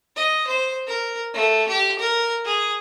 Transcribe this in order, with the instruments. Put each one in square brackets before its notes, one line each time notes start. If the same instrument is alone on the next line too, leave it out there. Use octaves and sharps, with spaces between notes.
[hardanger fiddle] D#5
C5
A#4
A3
G4
A#4
G#4